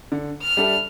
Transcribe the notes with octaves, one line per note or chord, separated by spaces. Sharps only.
D3
F6
G3 D4 A4 E5